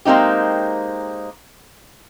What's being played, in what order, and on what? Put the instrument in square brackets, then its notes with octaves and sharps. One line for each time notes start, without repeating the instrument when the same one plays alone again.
[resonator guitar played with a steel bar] G#3 A#3 C4 D#4 G4